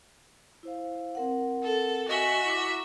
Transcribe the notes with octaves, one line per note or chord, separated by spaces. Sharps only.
E4 C5 F5
C4 A#4 F#5
A4
F#4 D#5 E5 G#5
E4 A#5 D6